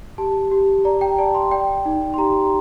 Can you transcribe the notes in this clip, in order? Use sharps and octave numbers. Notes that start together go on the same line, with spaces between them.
G4 A5
G4
D5 A#5
G5
D5 A5
C6
D5 G5
D#4
C6
G4 A#5